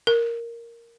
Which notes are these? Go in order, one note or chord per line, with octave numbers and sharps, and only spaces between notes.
A#4